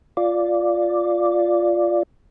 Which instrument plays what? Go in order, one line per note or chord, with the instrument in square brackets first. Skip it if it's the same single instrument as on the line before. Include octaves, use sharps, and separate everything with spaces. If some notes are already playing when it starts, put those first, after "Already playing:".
[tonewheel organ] F4 D5